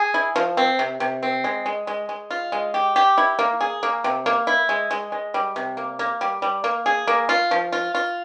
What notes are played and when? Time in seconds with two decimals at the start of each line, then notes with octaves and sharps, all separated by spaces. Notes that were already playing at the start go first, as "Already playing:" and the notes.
Already playing: G#4
0.14 E4
0.36 F3
0.57 C4
0.79 C3
1.00 C3
1.23 C4
1.44 G#3
1.66 G#3
1.87 G#3
2.09 G#3
2.31 F4
2.52 G#3
2.74 G4
2.96 G4
3.18 E4
3.39 A#3
3.61 G#4
3.83 A#3
4.04 C3
4.26 A#3
4.47 E4
4.69 G#3
4.91 G#3
5.12 G#3
5.34 G3
5.56 C3
5.77 A#3
5.99 A#3
6.21 G3
6.42 G3
6.64 A#3
6.86 G#4
7.07 A#3
7.29 F4
7.51 F3
7.72 F4
7.95 F4